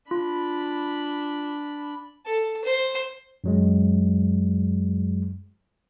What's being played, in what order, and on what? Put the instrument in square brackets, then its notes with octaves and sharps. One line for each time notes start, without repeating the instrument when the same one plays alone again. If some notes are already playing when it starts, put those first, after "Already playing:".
[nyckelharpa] D4 B5 [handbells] F4
[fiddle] A4
C5
[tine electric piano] F#2 F#3 G#3